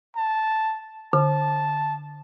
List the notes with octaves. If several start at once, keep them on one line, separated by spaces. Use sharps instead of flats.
A5
D3 A5